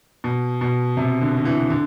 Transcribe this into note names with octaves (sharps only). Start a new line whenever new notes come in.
B2
B2
C3
D3
D3
E3
D3